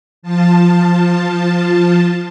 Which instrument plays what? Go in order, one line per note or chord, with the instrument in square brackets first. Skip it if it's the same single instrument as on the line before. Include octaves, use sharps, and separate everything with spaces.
[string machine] F3 F4 A5